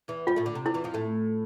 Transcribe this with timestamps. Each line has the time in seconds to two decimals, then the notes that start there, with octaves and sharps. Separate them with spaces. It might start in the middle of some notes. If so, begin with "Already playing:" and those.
0.08 E2 E3
0.27 G2 G3 F4
0.36 A2 A3
0.46 D3
0.55 C3
0.66 D3 E4
0.74 E2 E3
0.84 F2 F3
0.94 A2 A3